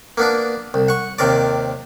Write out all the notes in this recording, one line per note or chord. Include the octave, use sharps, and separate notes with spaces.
A#3 B3 D4
C2
F#5 C#6
D#2 C3 A#4 D5